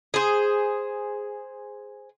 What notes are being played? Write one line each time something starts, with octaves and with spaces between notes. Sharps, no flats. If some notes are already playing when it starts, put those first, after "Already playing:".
G#4 C5